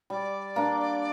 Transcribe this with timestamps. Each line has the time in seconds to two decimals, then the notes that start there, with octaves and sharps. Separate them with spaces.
0.10 G3 D5
0.56 A#3 D4